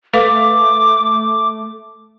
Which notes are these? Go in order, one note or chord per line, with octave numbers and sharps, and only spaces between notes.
A3 A4 B4 F5 D6